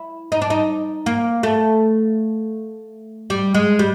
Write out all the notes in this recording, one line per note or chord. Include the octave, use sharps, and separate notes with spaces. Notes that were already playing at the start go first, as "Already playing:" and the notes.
Already playing: E4
D#4
D4
D#4
A#3
A3
G3
G#3
G3